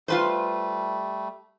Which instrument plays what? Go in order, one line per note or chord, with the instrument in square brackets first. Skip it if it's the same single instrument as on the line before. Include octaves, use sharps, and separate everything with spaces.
[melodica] G3 A3 [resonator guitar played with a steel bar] F4 B4 C5